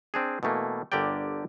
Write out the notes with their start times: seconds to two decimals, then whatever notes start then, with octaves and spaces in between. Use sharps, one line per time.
0.14 C4 D4 G#4
0.43 B2 E3 A3 A#3
0.92 G1 D3 G4 A#4 D5 G5